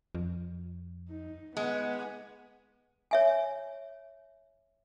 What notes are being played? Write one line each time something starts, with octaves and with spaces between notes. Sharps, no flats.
F2
D#4
G#3 B3 F#5
C#5 E5 G#5